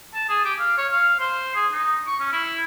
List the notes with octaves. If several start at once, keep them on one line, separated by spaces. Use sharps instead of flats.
A5
G#4
G4
F5
C#5
F5
C5
G#4
D#4
C#6
C#4
E4